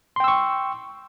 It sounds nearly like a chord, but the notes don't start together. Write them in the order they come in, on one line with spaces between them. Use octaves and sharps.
C6 G5 E6 C#6